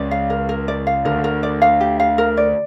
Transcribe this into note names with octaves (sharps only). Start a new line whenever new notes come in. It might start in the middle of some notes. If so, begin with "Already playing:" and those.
Already playing: C#2 C#3 D5
F5
A#4
A#4
D5
F5
D2 D3 A#4
A#4
D5
F5
G4
F5
A#4
D5